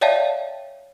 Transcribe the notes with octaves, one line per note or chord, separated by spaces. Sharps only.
C#5 D5 E5 F5 G5 A5